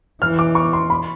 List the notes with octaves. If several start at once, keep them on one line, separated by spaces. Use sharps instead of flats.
E3 F6
D6
C#6
C6
B5